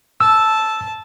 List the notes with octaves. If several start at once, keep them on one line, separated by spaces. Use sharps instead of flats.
A5 E6